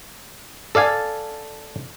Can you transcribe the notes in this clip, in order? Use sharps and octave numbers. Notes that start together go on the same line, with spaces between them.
A4 D5 F5 G#5